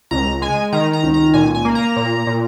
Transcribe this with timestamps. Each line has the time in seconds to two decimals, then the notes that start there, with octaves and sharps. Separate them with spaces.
0.11 C#2 A#5
0.42 G#3 G#5
0.73 D#3 A#5
0.93 A#5
1.03 C#2
1.14 A#5
1.34 A#2 G#5
1.55 G#5
1.65 A#3
1.75 A#5
1.96 A#2
2.27 A#2